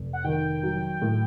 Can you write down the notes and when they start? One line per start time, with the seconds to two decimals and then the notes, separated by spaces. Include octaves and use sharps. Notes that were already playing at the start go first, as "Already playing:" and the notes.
Already playing: F1
0.13 F#5
0.24 D#3 G5
0.63 F#3
1.02 A2